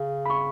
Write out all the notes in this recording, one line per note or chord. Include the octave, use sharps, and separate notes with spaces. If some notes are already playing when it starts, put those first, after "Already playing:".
Already playing: C#3
B5
C#6